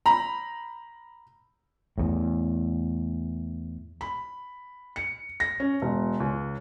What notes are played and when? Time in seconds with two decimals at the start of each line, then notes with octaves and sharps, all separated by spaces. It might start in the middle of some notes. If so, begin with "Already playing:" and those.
0.06 A#5 B5
1.98 E2 A2
4.01 B5
4.96 C#7
5.40 A#6
5.60 C#4
5.82 E1
6.20 C#2